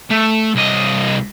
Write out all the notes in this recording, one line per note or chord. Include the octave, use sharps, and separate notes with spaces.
A3
C2 D#5